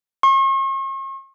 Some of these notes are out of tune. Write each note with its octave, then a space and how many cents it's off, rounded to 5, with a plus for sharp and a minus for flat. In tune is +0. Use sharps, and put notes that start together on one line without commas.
C#6 -45